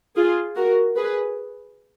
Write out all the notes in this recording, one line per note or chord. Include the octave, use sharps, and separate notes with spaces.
F4 G#4
F#4 A#4
G#4 B4